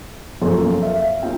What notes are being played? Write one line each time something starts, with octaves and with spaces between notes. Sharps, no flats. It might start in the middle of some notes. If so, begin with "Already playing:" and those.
F#2 F3 A#3 A4 C#5 C6
E5 F5
A#3 C#4 D#4 F4 G5